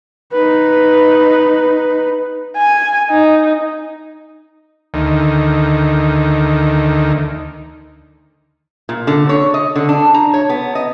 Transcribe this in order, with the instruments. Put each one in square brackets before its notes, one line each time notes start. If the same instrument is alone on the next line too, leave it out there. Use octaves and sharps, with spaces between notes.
[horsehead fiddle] D#4 B4
[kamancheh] G#5
D#4
[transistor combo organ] D2 D#3
[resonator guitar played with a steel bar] A#2
D3
C#5
D#5
D3
D4
A#5
C#5
B3
D#5